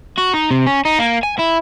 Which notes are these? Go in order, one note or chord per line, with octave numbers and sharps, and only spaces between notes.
F#4
D#4
C3
C#4
D#4
A#3
G#5
E4